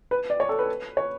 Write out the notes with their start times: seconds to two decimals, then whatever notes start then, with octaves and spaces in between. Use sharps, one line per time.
0.11 B4
0.30 D5
0.40 C#5
0.49 A4
0.59 B4
0.97 C#5